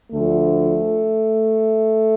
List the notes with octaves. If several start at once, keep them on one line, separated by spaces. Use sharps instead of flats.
D2 D3 F3 A3